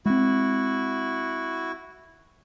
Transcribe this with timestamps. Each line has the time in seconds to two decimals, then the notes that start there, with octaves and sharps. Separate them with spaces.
0.06 G#3 C4 E4 F#4